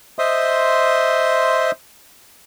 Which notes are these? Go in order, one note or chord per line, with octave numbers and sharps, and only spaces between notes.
C5 D#5 E5 C6 D#6